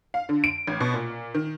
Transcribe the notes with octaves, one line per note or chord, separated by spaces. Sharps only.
F5
D3
D7
A1
B2
A#2
D#3